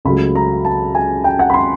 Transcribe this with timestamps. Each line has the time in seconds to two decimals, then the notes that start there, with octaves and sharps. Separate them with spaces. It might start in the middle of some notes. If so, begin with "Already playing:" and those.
0.05 C#2 C#3 F#3 A3 B5
0.35 A#5
0.65 A5
0.95 G#5
1.24 G5
1.39 F#5
1.50 B5
1.54 C6